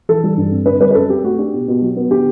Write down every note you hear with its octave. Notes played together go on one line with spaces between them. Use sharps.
E3 A4
G3
G2
C4
D3 B4
G3 B4
B4
F#2 A4
C4 G4
A3 F#4
D4 G4
B2
B2
F#3
B3
D3 G4